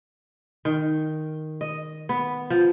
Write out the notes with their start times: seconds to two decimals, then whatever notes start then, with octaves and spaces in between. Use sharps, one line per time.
0.65 D#3
1.61 D#5
2.09 B3
2.50 F3